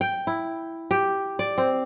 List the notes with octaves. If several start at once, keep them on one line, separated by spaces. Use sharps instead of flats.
G5
E4
G4
D5
C4